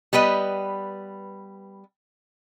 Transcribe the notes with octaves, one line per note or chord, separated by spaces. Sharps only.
G3 B3 B4 D#5